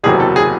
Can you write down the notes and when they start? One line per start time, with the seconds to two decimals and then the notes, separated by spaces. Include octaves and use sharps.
0.04 F#1 E2 C3 D#3 F#3 G#4
0.20 A4
0.36 G#4